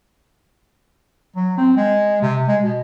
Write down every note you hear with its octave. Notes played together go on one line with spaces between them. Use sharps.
F#3
C4
G#3
C3
G#3
B2